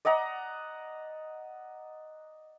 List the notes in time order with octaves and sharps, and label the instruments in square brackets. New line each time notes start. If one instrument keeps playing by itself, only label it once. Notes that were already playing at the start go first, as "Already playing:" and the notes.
[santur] D5 D#5 F#5 A#5